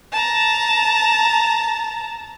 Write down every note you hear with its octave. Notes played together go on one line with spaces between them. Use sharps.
A5 A#5